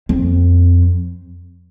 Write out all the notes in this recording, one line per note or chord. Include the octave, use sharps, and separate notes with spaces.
F2